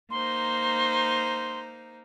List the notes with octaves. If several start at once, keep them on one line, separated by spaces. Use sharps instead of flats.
A#3 D#4 C5 C6